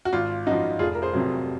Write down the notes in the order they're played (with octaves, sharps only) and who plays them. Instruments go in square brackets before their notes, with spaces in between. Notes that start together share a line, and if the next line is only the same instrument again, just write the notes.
[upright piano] F#4
G#1 F4
F#2 F3 D#4 F#4
F1 F4 G#4
A#4
G#4 C5
F2 C3 F#3